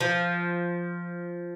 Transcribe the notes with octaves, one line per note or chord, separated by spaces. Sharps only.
F3